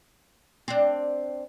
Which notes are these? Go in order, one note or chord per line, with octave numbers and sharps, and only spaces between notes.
C4 D4